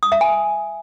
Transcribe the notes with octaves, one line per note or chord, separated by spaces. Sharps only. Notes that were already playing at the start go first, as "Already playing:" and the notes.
D#6
E5
G#5